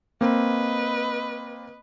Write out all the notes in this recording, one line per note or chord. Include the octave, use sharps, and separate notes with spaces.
A#3 C4 B4 D#5